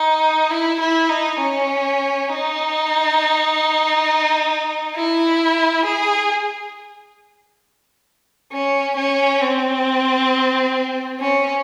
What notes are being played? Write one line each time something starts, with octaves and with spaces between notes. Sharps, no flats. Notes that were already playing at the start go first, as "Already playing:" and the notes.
Already playing: D#4
E4
E4
D#4
C#4
D#4
E4
G#4
C#4
C#4
C4
C#4